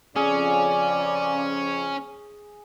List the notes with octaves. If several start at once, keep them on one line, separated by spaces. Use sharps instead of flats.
F2 C#3 C#4 G#4 D5